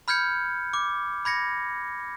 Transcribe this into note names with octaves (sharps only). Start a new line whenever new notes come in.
B5 F6 G6 G#6 C#7
D6
B5 G#6 A#6 C#7